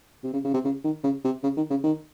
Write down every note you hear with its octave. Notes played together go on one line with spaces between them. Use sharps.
C3
C#3
C#3
C3
C#3
D#3
C#3
C3
C#3
D#3
C#3
D#3